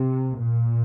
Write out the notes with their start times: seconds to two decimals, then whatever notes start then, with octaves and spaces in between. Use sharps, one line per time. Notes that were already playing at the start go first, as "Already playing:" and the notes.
Already playing: C3
0.38 A#2